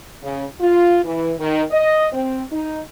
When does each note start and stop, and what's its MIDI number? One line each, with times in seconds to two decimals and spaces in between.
0.22 0.45 49
0.59 0.99 65
1.04 1.33 52
1.39 1.63 51
1.71 2.07 75
2.12 2.41 60
2.52 2.80 63